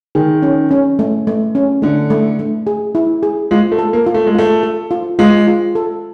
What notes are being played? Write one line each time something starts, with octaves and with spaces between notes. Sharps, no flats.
D#3 G#4
C#4
C#4
A3
A3
C#4
D3 A3
A3
A3
G#4
E4
G#4
G#3 F4
A3
A4
A#3
F4
A3
G#3
A3 F4
A4
F4
G#3 F4
F4
A4